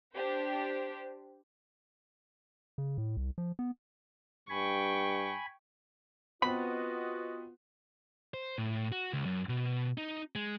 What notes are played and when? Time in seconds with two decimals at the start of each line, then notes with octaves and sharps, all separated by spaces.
0.13 D4 G4 C5
2.78 C#3
2.98 A2
3.17 C2
3.38 F3
3.59 B3
4.50 G2 G5 G#5 B5 C#6
6.42 B3 C4 F4 F#4 B4 D#5 B5
8.34 C5
8.58 A2
8.92 F#4
9.13 C#2
9.25 F#2
9.49 B2
9.98 D#4
10.35 G#3